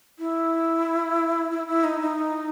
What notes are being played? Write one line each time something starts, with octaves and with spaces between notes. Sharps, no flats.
E4
E4
E4
D#4
D#4